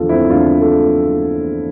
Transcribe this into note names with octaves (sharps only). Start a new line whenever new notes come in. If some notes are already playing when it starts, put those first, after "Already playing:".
Already playing: E2 D3 F3 F4 A4
C4 E4
E2 D3 F3 D4 F4
F4 A4